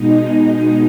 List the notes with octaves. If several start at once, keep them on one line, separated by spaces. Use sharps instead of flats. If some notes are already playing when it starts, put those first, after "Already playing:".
Already playing: B2 G#3 D#4